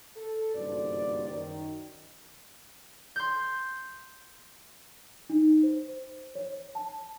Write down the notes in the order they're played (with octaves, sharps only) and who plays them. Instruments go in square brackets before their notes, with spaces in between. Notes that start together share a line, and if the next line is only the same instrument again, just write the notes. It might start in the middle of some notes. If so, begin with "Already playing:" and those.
[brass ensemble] A4
F#1 G2 B2 D#3 C5 D5
F#2 D#3
[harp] C6 G6
[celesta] D#4
C5
C#5
A5